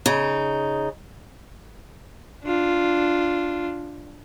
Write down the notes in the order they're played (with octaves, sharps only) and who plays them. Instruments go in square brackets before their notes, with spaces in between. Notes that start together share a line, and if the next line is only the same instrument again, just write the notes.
[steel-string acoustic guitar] C#3 D#4
[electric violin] D4 F4